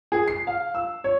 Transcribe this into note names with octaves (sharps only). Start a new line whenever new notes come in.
G#4
C7
F5
E6
C#5